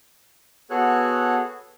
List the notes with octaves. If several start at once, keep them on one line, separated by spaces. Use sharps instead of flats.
B3 F#4 G#4 A4 C#5 F#6